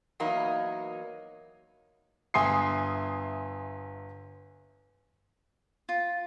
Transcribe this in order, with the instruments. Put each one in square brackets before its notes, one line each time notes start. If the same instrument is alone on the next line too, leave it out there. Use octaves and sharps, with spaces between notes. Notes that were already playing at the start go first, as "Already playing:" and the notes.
[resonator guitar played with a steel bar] E2 F#3 A#3 D#4
[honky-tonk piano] G1 E5 G#5 C6 D#6 C7
[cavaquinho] F4